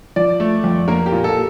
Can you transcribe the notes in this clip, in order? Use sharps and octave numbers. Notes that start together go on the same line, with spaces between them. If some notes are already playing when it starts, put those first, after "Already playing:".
F3 D5
A3
F2
A#3 A#4
G4
A#2
A4